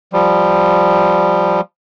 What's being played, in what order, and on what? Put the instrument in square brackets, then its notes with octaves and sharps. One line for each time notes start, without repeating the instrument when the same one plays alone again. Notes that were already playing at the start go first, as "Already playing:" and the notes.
[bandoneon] F3 G3